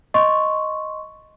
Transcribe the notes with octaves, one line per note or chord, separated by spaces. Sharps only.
D#5 C6 C#6